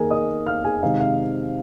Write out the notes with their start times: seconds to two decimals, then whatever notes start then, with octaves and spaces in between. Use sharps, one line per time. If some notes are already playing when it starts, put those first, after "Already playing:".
Already playing: D#3 A#3 D#4 G#4 A#4 G#5
0.10 D#5 D#6
0.46 F5 F6
0.64 G#4 G#5
0.82 C3 D#3 G#3 C4 D#4 F5
1.00 F5